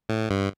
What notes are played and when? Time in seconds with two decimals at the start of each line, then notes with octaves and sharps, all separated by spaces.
0.09 A2
0.30 G2